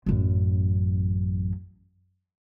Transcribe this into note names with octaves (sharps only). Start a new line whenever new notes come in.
A1 F#2